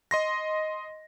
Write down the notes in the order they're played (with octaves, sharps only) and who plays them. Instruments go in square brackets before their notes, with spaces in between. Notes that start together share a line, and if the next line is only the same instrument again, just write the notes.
[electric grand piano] D#5 C6 A#6